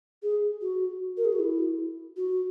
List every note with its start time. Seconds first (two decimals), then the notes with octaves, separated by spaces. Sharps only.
0.23 G#4
0.61 F#4
1.17 A#4
1.25 G#4
1.32 F#4
1.39 E4
2.16 F#4